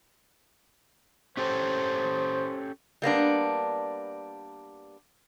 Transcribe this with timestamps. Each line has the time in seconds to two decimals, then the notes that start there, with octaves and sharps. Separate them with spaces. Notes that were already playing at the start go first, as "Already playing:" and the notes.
1.37 C#4 G4 A4 C5
3.02 G3 A#3 B3 D4